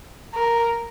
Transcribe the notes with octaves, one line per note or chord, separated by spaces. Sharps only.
A#4